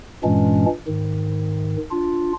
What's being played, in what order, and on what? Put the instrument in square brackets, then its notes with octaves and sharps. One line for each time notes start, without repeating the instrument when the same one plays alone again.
[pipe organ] G2 A#2 E3 G#3 C#4 D4
G#2 D#3
D4 F4